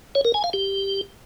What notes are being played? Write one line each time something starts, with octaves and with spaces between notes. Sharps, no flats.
C#5
A#4
G#5
F5
G4